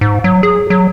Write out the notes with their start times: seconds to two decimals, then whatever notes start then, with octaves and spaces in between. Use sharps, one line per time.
0.01 G#2
0.24 F#3
0.43 G#4
0.70 F#3